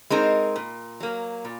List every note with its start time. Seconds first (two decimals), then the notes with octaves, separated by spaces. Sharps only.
0.10 G#3 C4 D#4 A#4
0.56 A#2
1.00 F#3 A#3
1.45 A#2